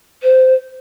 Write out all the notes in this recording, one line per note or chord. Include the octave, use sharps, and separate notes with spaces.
C5